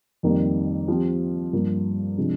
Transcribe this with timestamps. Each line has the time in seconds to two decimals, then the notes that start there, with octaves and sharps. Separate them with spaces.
0.23 F2 D#3 G3 A#3
0.88 F3 C4 G4
1.53 G2 F3 A#3
2.18 C3 F3 G#3 D4